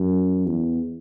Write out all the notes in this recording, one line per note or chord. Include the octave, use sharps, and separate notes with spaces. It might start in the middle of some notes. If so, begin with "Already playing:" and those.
Already playing: F#2
E2